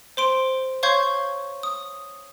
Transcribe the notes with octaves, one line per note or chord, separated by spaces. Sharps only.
C5 C6 D7
C#5 F5 C6 C#6 G6 G#6
D#6